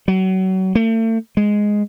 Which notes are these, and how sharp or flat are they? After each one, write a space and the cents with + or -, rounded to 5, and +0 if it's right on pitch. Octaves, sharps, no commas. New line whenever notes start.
F#3 +30
A3 +40
G#3 +0